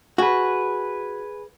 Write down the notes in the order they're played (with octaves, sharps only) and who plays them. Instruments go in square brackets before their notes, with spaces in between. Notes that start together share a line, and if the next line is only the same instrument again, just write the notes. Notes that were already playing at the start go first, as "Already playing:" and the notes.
[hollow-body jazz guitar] F#4 [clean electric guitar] G#4 B4